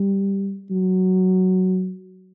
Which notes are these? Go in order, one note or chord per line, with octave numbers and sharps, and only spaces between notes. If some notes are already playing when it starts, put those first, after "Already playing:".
Already playing: G3
F#3